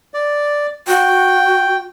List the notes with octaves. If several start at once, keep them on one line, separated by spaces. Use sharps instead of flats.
D5
F#4 G5